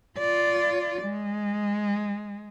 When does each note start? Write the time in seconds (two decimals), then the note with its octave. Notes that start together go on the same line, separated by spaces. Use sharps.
0.18 F4 D5
1.03 G#3